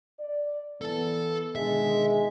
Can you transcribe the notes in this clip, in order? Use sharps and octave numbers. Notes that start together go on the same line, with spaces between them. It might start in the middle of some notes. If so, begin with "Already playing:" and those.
D5
E3 B3 A4 A5
B2 D3 D#3 G#3 E5